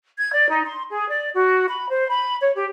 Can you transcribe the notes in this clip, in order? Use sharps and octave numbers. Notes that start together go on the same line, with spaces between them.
G#6
D5
D#4
C6
G#4
D5
F#4
B5
C5
B5
C#5
G4